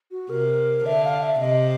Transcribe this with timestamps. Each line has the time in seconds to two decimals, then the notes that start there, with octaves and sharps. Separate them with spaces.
0.11 F#4
0.30 C3 A#4
0.85 D3 E5
1.04 F5
1.22 E5
1.40 C3 D#5